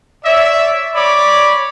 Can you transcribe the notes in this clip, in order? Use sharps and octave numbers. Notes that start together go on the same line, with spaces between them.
C#5 D5 E5
C#5 D5 B5 D6